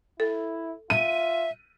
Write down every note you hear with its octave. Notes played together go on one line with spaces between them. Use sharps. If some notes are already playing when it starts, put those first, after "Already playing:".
E4 A4
F4 E5 D#7